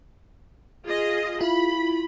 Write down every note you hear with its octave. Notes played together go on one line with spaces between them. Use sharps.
F4 G#4 D#5
E4 F4 B5